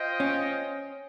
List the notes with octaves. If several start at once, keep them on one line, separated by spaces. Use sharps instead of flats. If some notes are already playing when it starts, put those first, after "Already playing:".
Already playing: F4 C5 D#5 G5
C#4